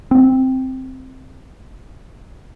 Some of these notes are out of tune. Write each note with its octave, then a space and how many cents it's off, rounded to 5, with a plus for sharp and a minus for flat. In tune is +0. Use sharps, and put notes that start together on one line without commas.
C4 +0